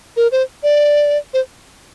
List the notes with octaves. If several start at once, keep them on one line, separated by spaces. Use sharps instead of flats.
A#4
C5
D5
C5